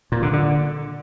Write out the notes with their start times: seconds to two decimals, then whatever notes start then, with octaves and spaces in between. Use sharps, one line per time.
0.12 A#2
0.22 D3
0.33 D3